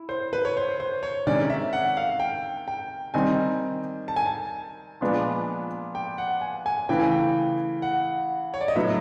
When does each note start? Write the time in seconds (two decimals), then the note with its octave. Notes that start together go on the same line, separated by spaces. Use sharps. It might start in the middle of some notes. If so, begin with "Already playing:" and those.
Already playing: E4
0.09 C5
0.33 B4
0.45 C#5
0.57 C5
0.80 C5
1.03 C#5
1.27 C3 D#3 G#3 C#4 D5
1.50 E5
1.73 F#5
1.97 F5
2.20 G5
2.68 G5
3.14 D#3 G3 C4 D#4 G#5
4.08 A5
4.16 G#5
4.26 A5
5.01 A#2 F3 G#3 B3 D4
5.95 G5
6.18 F#5
6.41 G#5
6.66 G#5
6.89 C#3 E3 A3 G5
6.99 G#5
7.11 G5
7.82 F#5
8.54 C#5
8.61 D5
8.68 D#5
8.76 A2 F#3 B3 E5